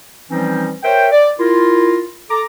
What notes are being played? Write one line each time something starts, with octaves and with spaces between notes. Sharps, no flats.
E3 F3 G3 C4 C#4 D#4
A#4 C5 C#5 E5 G5
D5
E4 F4 A#4
A4 A#5 D6